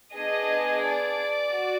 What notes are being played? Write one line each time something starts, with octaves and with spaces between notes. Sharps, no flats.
B3 D4 G#4 D#5
D5
F#4